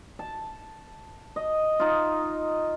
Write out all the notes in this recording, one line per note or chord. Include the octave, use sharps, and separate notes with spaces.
A5
D#5
D#4 F4